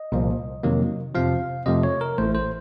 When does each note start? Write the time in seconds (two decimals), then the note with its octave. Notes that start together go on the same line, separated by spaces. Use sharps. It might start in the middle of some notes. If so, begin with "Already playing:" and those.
Already playing: D#5
0.12 C2 A#2 F3 A#3
0.63 F2 C3 D#3 F#3 A#3
1.15 F2 C3 F3 F5
1.66 F2 C3 F3 A3 D#5
1.83 C#5
2.01 A#4
2.18 A1 A2 A3 C5
2.35 C5